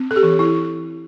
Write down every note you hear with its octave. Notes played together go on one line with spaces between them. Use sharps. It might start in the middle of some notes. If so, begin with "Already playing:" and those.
Already playing: C4
A4
G4
E3
E4